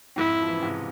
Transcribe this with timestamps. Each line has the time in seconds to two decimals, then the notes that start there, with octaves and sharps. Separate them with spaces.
0.16 F2 G#2 E4
0.42 F3
0.48 E3
0.56 C#3
0.62 G#2 C3